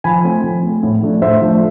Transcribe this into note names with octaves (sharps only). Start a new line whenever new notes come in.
F3 G#5 B5
A3 C4
F3
A3 C4
A2
F3 A3 D4
A2 C5 E5
F3 A3 D4